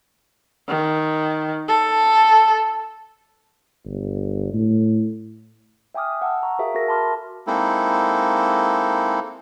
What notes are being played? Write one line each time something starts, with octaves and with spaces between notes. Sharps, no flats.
D#3
A4
G1
A2
E5 G5 G#5 D6 D#6 F6
F#5 A5 E6
A#5 C#6
F#4 G#4 A#4 E5 F5
F#4 A4 A#4 A#6
E5 A5 B5 C6 D6 F6
G#3 A#3 C4 D#4 E4 A4